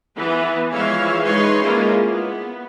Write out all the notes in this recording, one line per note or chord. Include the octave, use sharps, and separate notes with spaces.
E3 B3 B4
E3 F3 G#3 E4 C#5 F5
G#3 D#4 B4 C#5 C6
G#3 A#3 C#4 E4 F4
B3